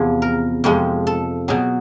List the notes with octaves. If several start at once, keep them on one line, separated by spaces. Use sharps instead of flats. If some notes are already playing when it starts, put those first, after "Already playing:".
Already playing: E2 C3 F3 G#4
A#4
F2 C3 F3 G#3
A4
B2 F#3 G#4